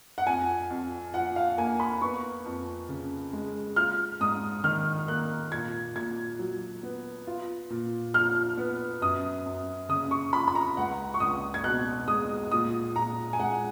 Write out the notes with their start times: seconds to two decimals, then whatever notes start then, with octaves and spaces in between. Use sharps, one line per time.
0.18 F#5
0.26 F2 G#5
0.70 F2
1.14 F3 F#5
1.36 F5
1.58 A#3 G#5
1.80 B5
2.01 B3 C#6
2.46 F2
2.89 C#3
3.33 G#3
3.76 F4 F6
4.21 G#2 D#6
4.64 D#3 F6
5.08 A#3 F#6
5.51 A#2 G#6
5.95 A#2 G#6
6.39 F#3
6.83 B3
7.27 F4
7.70 A#2
8.14 F3 F6
8.58 B3
9.01 F#2 D#6
9.46 F#2
9.89 C#3 D#6
10.11 C#6
10.33 F3 B5
10.48 B5
10.55 A#5
10.77 C#2 F#5
11.14 C#6
11.20 C#2 D#6
11.54 G#6
11.64 B2 F#6
12.08 G#3 D#6
12.51 A#2 D#6
12.96 A#2 A#5
13.33 G#5
13.40 G#3 F#5